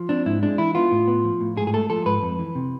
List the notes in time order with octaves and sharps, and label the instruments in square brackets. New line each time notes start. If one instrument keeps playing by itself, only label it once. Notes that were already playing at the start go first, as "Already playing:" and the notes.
Already playing: [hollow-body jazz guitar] F3
C4 D4
G#2 E4
G#3 D4
E3 E4
B3 F4
A2
B3
F3
A2
G#2 G#4
G#4
A3 A4
F3 A4
G#2 B4
F2
E3
C3